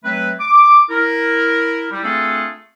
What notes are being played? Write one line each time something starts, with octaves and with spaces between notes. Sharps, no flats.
F#3 A3 C4 B4
D6
E4 A#4
G3
A3 C4 D4 F4 G#4 A4